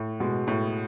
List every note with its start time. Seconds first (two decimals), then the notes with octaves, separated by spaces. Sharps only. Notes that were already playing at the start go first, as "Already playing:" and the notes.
Already playing: A2
0.20 B2 G#3
0.47 A2